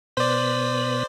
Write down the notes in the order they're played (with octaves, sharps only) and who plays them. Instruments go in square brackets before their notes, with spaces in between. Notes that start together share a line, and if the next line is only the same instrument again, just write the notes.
[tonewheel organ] B2 B3 B4 [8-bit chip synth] C5 D5